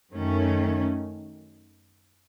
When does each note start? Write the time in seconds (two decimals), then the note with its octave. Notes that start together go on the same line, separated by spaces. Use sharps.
0.13 F#2 D#3 A3 C#4